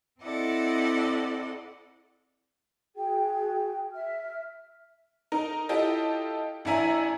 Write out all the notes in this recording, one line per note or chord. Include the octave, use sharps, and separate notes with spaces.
C4 E4 A4 D5 D#5 F#5
F#4 G#4 G5
E5 F6
D#4 A#4
E4 F4 G4 A4 D#5
A1 D4 E4 E5 G#5 A#5